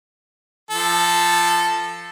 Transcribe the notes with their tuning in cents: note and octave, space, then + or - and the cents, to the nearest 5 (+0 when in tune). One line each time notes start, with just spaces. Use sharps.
F3 -15 A4 +0